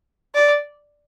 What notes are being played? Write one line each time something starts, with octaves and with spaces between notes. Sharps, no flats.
D5